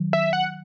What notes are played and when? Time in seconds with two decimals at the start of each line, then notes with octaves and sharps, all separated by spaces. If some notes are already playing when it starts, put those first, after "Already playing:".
Already playing: D#3 F#3
0.13 E5
0.33 F#5